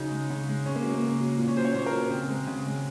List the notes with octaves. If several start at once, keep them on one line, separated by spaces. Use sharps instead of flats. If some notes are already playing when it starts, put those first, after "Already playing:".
Already playing: C#3 F#3 D#4
G#3
C#3
G#3
C#3 C#4
A#3
F#3
A#3
C#3
F#3
A#2
C#4
F#3 C5
C#5
A#2 C5
A#4
F#3
C#3 C4
G#3
C#3
G#3